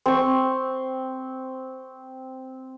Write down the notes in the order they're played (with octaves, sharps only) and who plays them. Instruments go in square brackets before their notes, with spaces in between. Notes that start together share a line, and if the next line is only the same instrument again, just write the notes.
[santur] C4 C#6